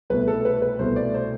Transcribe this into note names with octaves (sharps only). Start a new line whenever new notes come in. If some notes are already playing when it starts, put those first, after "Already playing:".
C2 B2 A3 B4
A4
B4
B4
C2 B2 A3 C5
D5
C5